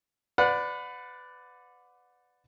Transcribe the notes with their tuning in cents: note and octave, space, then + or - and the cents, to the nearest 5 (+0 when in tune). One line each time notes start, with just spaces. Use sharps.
B4 +20 D5 +0 F#5 -25